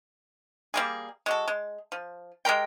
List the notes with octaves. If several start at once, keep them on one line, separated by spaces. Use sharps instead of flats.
G3 A#3 G#4
G#3 F#4 A4
G#3
F3
G#3 G4 A#4 G5